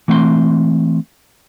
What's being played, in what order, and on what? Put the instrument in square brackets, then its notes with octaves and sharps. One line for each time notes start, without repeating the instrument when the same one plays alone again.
[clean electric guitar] E3 A3 C4 E5 C6